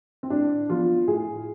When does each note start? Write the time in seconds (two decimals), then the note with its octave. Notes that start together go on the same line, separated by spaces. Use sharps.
0.23 C4
0.30 A2 D4
0.69 F3 B3 F4
1.07 A2 G#4